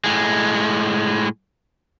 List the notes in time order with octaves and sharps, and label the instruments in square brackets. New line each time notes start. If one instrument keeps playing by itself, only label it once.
[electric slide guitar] A2 G#3